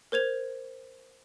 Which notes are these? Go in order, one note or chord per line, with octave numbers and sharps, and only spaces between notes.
A#4 C5 G#6 F7